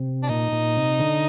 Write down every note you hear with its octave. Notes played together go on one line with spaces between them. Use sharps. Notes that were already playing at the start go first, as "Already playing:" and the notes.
Already playing: C3
D4
A#2 D#4
A#2
C3
D3